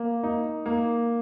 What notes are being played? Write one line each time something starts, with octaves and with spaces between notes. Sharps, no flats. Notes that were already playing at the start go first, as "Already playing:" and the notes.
Already playing: A#3
D#4
A#3